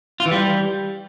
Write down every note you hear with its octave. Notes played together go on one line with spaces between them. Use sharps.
F4
E3
G3